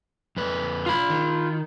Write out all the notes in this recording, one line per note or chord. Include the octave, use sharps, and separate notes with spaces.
F2 B4
F4 B5
D#3